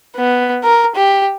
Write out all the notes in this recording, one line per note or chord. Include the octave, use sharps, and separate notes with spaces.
B3
A#4
G4